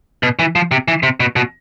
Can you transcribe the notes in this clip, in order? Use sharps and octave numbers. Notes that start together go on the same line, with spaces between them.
B2
E3
F3
C3
E3
C3
B2
B2